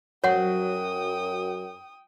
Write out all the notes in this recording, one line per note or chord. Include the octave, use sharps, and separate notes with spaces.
F#2 F#3 C#5 F#5 G5 D#6